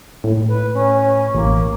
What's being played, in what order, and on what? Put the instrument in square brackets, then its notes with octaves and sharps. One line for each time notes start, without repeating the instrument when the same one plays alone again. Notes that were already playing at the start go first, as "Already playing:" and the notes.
[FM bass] A2
[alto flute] B4
C#4
[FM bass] A1 [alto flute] A#3